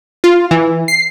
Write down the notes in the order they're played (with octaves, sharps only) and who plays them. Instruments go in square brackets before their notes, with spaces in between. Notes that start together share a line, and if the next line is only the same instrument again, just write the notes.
[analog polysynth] F4
E3
C7